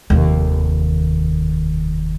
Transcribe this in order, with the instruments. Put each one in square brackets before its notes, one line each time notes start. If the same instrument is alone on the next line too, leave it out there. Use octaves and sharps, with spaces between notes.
[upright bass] F1 D#2